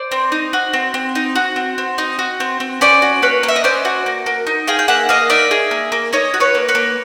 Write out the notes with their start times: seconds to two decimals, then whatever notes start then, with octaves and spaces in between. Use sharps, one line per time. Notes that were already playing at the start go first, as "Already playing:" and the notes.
Already playing: C5 D5
0.12 C4
0.32 D#4
0.53 F#4
0.73 C4
0.94 C4
1.15 D#4
1.35 F#4
1.56 C4
1.78 C4
1.98 D#4
2.19 F#4
2.40 C4
2.60 C4
2.81 C#4 C5 D5
3.02 F#4
3.22 A#3 B4 C#5
3.43 A#3
3.48 E5
3.56 D#5
3.64 C#4 C5 D5
3.85 F#4
4.06 A#3
4.26 A#3
4.47 D#4
4.67 G#4 F5 G5
4.79 G5
4.88 A#3 E5 F#5
5.09 A#3 D#5 F5
5.30 D#4 D5 E5
5.51 G#4
5.71 A#3
5.92 A#3
6.13 D#4 C#5 D#5
6.34 F#4
6.40 B4 C#5
6.55 A#3
6.68 B4 C#5
6.75 A#3